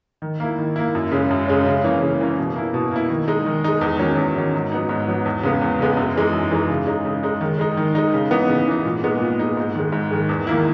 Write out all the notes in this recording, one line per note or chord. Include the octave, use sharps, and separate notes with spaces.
D#3
A#3 E4
D#3
A#3 E4
F#2
C#3 G#3 C#4
F#2
C#3 G#3 C#4
C#3
E3 A#3 C#4
C#3
E3 A#3 C#4
B2
A#3 E4
B2
A#3 E4
D#3
G#3 D#4
D#3
G#3 D#4
E2
D#3 F#3 C#4
E2
D#3 F#3 C#4
G#2
F#3 B3 D#4
G#2
F#3 B3 D#4
E2
C#3 G#3 B3
E2
C#3 G#3 B3
F#2
E3 G#3 D#4
F#2
E3 G#3 D#4
C#3
G#3 D#4
C#3
G#3 D#4
D#3
G#3 D#4
D#3
G#3 D#4
C#3
E3 B3 D#4
C#3
E3 B3 D#4
A#2
G#3 B3 D#4
A#2
G#3 B3 D#4
G#2
D#3 G#3
G#2
D#3 G#3
E2
D#3 A#3 E4